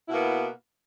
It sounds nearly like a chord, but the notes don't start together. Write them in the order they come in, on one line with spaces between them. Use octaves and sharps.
E4 B2 A#3 B3